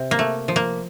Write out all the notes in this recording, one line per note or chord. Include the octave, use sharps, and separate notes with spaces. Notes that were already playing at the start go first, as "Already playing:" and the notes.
Already playing: C3
A#3
A3
F3
A#3